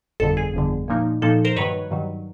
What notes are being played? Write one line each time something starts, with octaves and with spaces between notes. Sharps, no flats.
G1 F2 D3 A4
G#4
G1 F2 D3
A#2 F3 A#3 D#4
A#2 F3 A#3 D#4 A4
A#4 C5
G2 D#3 F#3 B4 C#5
G2 D#3 F#3